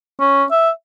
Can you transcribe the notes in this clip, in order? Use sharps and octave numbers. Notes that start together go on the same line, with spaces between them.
C#4
E5